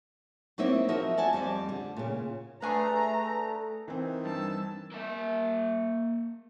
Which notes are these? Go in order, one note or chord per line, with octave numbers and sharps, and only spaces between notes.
F#3 A#3 C4 D#4 E4 E5
F3 F#4 A#4 D#5 E5
D5 F#5 G#5 A5
F2 G3 C4 A5
D3
A#2 C#3
A3 D4 G#4 B4 A#5
D#3 E3 C4
G2 A5 E6
A#3 E5